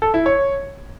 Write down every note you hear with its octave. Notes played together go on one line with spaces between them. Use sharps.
A4
E4
C#5